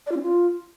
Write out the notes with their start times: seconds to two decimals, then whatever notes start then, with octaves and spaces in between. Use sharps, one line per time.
0.06 D5
0.11 F4
0.17 C#4
0.22 F4